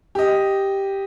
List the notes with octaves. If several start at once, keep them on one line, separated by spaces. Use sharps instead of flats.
G4 D#5